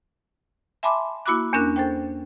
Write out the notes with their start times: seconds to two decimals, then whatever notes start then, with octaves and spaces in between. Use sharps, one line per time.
0.83 E5 G#5 A5 B5 C6 D6
1.26 A#3 E4 F#4 B5 D6 F#6
1.53 E2 A#3 C#4 D4 A#4 F#6
1.76 A4 C5 G5